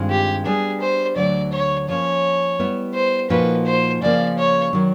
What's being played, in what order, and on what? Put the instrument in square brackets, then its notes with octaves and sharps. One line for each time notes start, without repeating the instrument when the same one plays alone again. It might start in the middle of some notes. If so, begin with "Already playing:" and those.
Already playing: [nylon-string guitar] G2 D#3 G#3 C4 F4
[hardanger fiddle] G4
[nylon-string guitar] G3 B3 D4 [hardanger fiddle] G#4
[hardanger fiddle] C5
[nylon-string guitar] D2 D3 F#3 [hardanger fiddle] D5
[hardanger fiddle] C#5
[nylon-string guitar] F3 A#3 C#4 [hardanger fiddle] C#5
[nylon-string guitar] G3 B3 E4
[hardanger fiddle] C5
[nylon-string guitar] A#2 F3 A#3 D#4 F#4 [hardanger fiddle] B4
[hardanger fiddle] C5
[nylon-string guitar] C#3 F3 A#3 [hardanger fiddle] D5
[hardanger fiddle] C#5
[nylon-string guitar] D#3 F#3